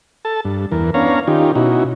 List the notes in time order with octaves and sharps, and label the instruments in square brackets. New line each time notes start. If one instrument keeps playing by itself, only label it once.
[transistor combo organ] A4 A5
G2
E2 E3 A#4
B3 C#4 D4 C#5 F5 A#5
D#3 C#4 D#4 F4 G4
B2 C#4 D#4 E4 F#4